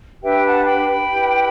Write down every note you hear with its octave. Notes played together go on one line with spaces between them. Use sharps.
D4 G4 B4 E5 G5
F#5 A5
G5 B5
E4 G4 B4